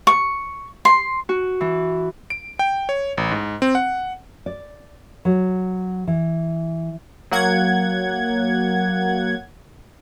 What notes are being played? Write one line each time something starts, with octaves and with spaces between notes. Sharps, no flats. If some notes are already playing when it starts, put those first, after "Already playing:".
C#6
C6
F#4
E3
D7
G5
C#5
A1
G#2
C4
F#5
D5
F#3
E3
F#3 A#3 F#5 G#6